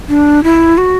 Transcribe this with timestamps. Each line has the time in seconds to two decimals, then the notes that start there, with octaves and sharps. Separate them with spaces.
0.09 D4
0.44 E4
0.78 F#4